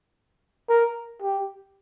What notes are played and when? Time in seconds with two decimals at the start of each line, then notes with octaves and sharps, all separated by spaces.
0.69 A#4
1.22 G4